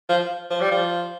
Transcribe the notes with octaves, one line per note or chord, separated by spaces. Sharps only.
F3
F3
G3
F3